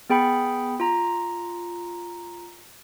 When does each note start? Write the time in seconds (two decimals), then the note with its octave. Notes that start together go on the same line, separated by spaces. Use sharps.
0.10 B3 G#4 G5 B5 C#7
0.80 F4 A#5